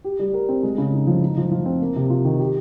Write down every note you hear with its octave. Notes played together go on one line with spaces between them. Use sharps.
G4
G3
A#4
C4
G#3
C#3
D#4
F3
D#4
F3
F3
C4
A#3
C3
F4
D#3
G4